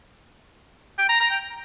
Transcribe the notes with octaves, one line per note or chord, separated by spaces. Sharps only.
G5
A#5
A#5
G5